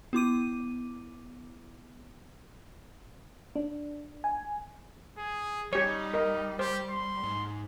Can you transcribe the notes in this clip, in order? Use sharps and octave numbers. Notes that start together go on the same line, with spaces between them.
B3 E4 D6 D#7
D4
G#5
G#4
G3 D#4 G4 C#5
A#4 D#5
G4 C5
C6
G#2